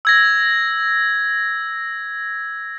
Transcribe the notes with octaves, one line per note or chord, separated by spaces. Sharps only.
E6 G#6 A#6